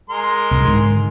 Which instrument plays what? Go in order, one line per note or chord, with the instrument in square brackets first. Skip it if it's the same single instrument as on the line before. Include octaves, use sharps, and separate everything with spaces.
[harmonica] G#3 A#4 C6
[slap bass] C2 G#2
G#2 D3 D#3